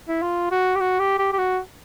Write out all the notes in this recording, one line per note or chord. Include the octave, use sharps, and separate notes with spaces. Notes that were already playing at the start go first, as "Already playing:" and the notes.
E4
F4
F#4
G4
F#4
G4
G4
G4
F#4